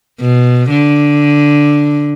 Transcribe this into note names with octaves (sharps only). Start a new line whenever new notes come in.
B2
D3